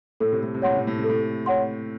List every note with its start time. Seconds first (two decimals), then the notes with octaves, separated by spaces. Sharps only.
0.20 A2 A4
0.32 C3
0.43 A2
0.55 C3
0.62 A2 C#5 F#5 C6
0.77 C3
0.87 A2
0.99 C3
1.04 A4
1.09 A2
1.46 C#5 F#5 C6